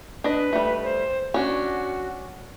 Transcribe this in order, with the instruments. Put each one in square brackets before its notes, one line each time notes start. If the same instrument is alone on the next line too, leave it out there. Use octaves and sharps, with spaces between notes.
[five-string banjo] D4 D#5 [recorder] B4
[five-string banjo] G3 A3
[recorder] C5
[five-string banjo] C#4 D4 [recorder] F#4